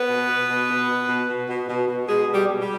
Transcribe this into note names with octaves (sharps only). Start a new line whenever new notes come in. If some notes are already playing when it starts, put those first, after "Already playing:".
Already playing: B3 B4
B2
B2
B2
B2
B2
B2
B2
B2
B2
B2
B2 G#3 G#4
B2
G3 G4
B2
G3 G4